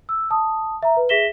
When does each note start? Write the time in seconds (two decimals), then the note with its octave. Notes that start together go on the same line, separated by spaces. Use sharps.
0.09 E6
0.31 A5 D#6
0.83 E5 A#5
0.97 B4
1.09 G#4 E5 A#6 B6 E7 G7